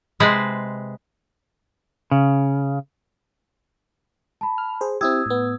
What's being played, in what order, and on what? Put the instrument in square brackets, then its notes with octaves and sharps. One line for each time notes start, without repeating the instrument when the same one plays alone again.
[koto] C3 G#3 G#4 B4 C5 A5
[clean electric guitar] C#3
[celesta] A5 B5
[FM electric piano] F6
G#4 C5
[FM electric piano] C4 E4 G4 [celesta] D#6 E6 G#6
[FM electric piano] A2 B3